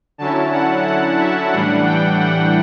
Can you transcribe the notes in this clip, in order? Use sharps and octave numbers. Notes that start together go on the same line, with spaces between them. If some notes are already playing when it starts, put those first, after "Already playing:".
D3 F#3 C#4 E4 A5
F#5
F#5
E5
A2 E3 G3 D4 F#5
G5
F#5